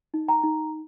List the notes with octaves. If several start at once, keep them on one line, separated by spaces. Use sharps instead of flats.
D#4
G5 A#5
D#4